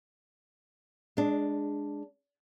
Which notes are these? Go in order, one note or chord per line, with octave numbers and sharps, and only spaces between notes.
G#3 D4